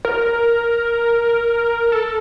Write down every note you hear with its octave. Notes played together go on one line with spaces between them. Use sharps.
A#4
A4